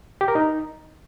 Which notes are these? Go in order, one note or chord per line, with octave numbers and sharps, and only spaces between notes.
G4
A#4
D#4